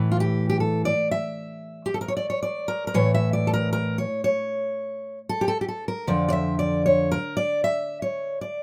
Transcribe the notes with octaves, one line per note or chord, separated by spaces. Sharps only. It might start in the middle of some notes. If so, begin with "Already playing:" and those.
Already playing: A2 E3
F4
G4
G4
A4
D5
E5
G4
A4
A#4
C#5
D5
C#5
D5
A#4
A#4
A2 E3 C#5
E5
D5
A4
A#4
A#4
C#5
C#5
A4
G4
A4
G4
A4
A#4
F2 D3 F3 D5
D5
E5
D5
C#5
A#4
D5
E5
C#5
D5